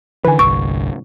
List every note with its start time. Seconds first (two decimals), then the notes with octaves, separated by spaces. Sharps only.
0.25 D3 E3 B4 G#5
0.39 G1 C2 C#6 E6 D7